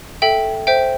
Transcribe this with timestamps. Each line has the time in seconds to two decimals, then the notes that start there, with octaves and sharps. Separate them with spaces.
0.22 A4 E5 G5
0.67 C5 E5 G5